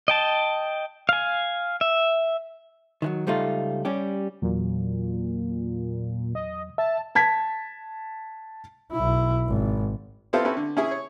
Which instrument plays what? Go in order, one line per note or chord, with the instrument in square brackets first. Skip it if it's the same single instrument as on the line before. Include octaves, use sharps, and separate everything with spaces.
[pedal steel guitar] D#5 G5 A5
F5 G#5
E5
[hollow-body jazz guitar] D#3 E3 F#3
C#2 G3 A3 D#4 F4
G3 C#4 G4
[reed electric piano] E2 F#3 [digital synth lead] A#2
[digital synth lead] D#5
[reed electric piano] E5 [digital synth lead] A5
[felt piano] A5 G#6 B6
[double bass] B1 E4
G#1
[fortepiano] B3 C4 E4 F4 A4 C5
C4 C#4 E4 A4 B4
D3
C#4 E4 G#4
C#5